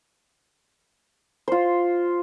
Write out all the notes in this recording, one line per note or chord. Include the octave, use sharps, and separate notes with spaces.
F4 C5